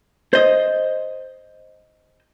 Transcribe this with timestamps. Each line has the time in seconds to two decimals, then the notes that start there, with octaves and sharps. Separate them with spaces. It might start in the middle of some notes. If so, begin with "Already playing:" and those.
0.33 C5 D#5